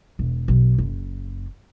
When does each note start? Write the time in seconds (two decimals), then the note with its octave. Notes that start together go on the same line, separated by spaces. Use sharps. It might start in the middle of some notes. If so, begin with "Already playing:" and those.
0.19 E1
0.48 B1
0.78 F#1